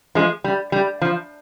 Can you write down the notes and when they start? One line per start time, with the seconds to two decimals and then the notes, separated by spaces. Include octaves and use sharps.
0.15 F3 G#3
0.44 G3
0.72 G3
1.02 F3